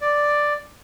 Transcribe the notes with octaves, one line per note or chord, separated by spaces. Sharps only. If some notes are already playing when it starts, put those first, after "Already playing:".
D5